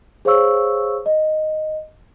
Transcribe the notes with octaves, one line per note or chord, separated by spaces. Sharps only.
G#4 C5 C#5 F5 C#6 E6
D#5